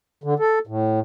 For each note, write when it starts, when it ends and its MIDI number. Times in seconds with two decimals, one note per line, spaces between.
0.24 0.34 50
0.39 0.59 69
0.67 1.00 45